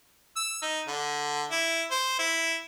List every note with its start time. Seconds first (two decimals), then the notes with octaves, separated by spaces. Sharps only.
0.36 E6
0.62 D#4
0.87 D3
1.51 E4
1.91 C5
2.19 E4